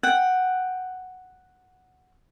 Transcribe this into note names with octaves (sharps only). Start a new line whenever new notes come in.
F#5 G5